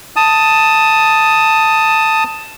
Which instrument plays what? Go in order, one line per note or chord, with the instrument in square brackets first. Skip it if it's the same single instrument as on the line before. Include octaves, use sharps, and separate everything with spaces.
[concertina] A5 D#6